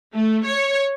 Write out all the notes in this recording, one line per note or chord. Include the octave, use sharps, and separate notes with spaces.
A3
C#5